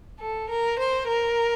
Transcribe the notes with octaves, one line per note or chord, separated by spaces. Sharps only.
A4
A#4
C5
A#4